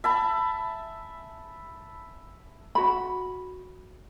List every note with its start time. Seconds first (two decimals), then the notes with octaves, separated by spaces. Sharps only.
0.04 E5 A5 B5
2.75 F#4 B5